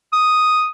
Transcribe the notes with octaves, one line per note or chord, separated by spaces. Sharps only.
D#6